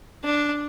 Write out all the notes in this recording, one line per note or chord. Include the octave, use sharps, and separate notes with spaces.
D4